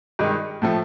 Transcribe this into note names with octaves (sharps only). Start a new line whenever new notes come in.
G2 D#3 G#3
A2 F3 A3